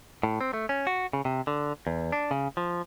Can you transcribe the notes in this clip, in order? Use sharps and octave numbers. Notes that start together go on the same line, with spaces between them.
A2
C4
A3
C#4
F#4
C#3
C3
D3
E2
D4
C#3
F3